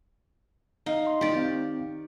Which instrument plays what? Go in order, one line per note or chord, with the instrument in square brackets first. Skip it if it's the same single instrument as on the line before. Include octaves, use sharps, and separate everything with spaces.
[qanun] D#4 [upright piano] F5
[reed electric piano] C6
[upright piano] D#3 [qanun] G4 D5
[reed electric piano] C4 F5